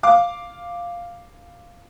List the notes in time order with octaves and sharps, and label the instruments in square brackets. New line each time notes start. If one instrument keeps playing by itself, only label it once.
[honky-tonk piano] F5 D6